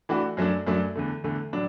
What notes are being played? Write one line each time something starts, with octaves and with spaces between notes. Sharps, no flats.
E3 A3 D4 F#4
F#2 F#3 A3 D4
F#2 F#3 A3 D4
E2 D3 A3
E2 D3 A3
A2 F#3 D4